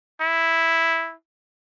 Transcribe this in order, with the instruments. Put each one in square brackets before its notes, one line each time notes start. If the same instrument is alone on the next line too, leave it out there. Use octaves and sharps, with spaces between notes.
[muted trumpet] E4